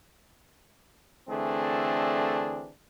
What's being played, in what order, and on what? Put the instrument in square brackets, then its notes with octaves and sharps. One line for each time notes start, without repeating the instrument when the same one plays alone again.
[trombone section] D3 E3 A3 C4 D4 G#4